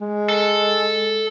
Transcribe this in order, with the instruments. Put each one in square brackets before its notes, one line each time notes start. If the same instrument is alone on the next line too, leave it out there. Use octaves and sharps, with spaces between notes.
[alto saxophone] G#3
[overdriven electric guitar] A4